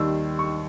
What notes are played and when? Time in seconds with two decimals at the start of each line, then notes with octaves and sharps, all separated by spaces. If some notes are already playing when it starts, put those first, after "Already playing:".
Already playing: D#2 D#3 G3 E6
0.39 C#6